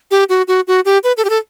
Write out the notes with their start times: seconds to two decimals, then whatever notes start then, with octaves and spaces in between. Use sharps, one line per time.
0.11 G4
0.29 F#4
0.48 F#4
0.67 F#4
0.85 G4
1.04 B4
1.17 A4
1.25 G4
1.30 A4